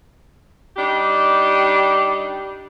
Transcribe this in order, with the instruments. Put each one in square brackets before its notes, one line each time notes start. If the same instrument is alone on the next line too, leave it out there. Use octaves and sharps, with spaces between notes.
[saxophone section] G3 D4 D#4 G4